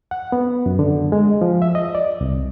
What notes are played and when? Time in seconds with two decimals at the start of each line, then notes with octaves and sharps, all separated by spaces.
0.11 F#5
0.32 B3
0.66 F#2
0.79 D3
1.12 G#3
1.41 F3
1.62 E5
1.75 D#5
1.95 D5
2.21 C2